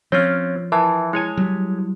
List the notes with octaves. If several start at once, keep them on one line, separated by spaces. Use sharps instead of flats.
F3 C4 C#4 F4 C#5 F6
E3 A#4 E5 A5
G#3 E4 C#5 G#5
F#3 G3